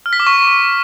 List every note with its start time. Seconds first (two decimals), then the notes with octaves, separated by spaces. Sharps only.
0.06 F6
0.13 B6
0.20 D6
0.27 C#6